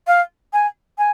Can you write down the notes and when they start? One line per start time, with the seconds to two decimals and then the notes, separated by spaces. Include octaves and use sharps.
0.07 F5
0.53 G#5
0.98 G#5